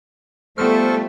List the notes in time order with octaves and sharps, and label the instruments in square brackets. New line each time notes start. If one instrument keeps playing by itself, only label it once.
[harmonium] F3 G3 [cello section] A3 [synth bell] B3 F6 [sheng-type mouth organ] A4 C5 C#6